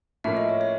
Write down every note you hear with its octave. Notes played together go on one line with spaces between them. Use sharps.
A2 F3 A#3 C#4 E5
D#5
C#5
C#5